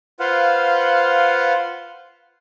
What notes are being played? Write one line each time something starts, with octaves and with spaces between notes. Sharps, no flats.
F4 B4 C5 F5 F#5